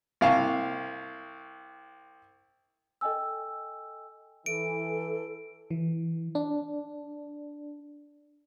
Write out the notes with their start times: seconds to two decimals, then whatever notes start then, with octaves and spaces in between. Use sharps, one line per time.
0.21 C2 F5 A5
3.01 A4 D#5 G5 G#5 E6
4.46 E3 A4 D7
5.71 E3
6.35 D4